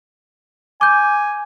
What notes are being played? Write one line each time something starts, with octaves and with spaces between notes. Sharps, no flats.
G#5 D6 G6